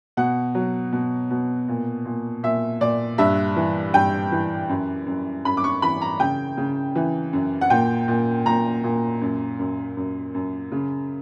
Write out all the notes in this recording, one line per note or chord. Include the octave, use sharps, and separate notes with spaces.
B2 F#5
F#3
B2
B2
A#2
A#2
A#2 E5
A#2 D5
G2 E5
E3
G2 G5
E3
F#2
F#2
F#2 B5
D6
C#6
E3 B5
A#5
C#3 G5
C#3
E3
F#2
F#5
A#2 G5
A#2
A#2 A#5
A#2
F#2
F#2
F#2
F#2
C#3